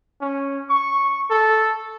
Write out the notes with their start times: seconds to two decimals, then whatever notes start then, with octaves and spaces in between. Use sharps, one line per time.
0.21 C#4
0.70 C#6
1.30 A4